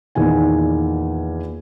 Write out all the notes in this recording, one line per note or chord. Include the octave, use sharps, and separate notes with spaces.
E2 A#2 D#3 G#5